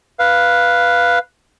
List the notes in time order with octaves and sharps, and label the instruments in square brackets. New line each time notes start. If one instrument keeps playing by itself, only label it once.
[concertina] B4 F5